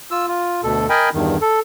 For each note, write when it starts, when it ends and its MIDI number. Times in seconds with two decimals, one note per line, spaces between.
0.11 0.26 65
0.11 0.26 88
0.28 0.61 65
0.63 0.87 38
0.63 0.87 47
0.63 0.87 69
0.90 1.09 70
0.90 1.09 75
0.90 1.09 79
0.90 1.09 80
0.90 1.09 83
1.14 1.37 40
1.14 1.37 43
1.14 1.37 51
1.41 1.60 69